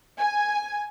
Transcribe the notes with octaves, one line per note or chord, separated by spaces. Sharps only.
G#5